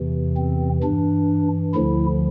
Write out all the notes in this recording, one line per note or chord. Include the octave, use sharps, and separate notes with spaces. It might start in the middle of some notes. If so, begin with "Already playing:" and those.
Already playing: E2 C3 E3
C4
G2 E3 D4
D2 D3 F3 E4